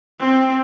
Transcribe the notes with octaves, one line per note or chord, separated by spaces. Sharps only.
C4